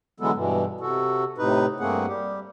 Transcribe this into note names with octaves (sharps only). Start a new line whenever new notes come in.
D3 E3 F#3 G#3 B3 A4
G2 B2 E3
C3 F#4 A4
A2 C3 D#4 B4
G2 A3 A#3 C4 G#4 F#5
G3 G4